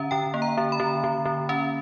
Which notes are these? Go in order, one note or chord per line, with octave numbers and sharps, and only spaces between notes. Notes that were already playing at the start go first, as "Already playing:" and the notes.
Already playing: D3 C#4 E5 F#5 A#5
D3 G5
A#3
A#5
D3
B5
D3
D3
D3
C#4